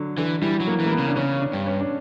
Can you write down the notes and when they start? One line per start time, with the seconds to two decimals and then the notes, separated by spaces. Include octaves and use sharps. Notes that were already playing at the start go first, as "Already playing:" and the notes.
Already playing: D3 F#3
0.18 D3 E3
0.42 E3 G3
0.60 F#3
0.67 A#3
0.80 E3
0.86 A#3
0.92 B3
0.98 C#3
1.08 D4
1.16 C#3 C#4
1.41 D4
1.53 G2
1.67 C#4
1.80 D4